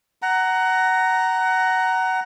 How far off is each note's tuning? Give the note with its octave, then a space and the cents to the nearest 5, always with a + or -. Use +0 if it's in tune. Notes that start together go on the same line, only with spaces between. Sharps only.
F#5 +20 A#5 +0